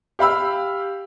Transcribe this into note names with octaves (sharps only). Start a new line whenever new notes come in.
G4 F5 B5 E6